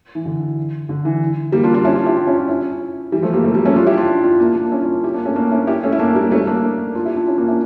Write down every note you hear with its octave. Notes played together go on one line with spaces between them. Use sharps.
E3
D3
D3
E3
G3 A#3
D4 F4
D4 F4
C#4 E4
D4 F4
E4 G4
D4 F4
C#4 E4
D4 F4
C#4 E4
E3 G3
F3 A3
G3 A#3
F3 A3
G3 A#3
A3 C#4
D4 F4
E4 G4
D4 F4
D4 F4
A#3 D4
A#3 D4
C#4 E4
D4 F4
E4 G4
A#3 D4
A3 C#4
A#3 D4
C#4 E4
E4 G4
A3 C#4
E4
A#3 D4
G3 A#3
A3 C#4
A#3 D4
D4 F4
E4 G4
D4 F4
C#4 E4
A#3 D4
C#4 E4